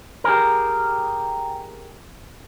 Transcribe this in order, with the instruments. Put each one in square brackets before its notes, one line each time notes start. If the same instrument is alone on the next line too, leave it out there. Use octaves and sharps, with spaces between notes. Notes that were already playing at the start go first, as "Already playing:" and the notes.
[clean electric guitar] G4 G#4 A#4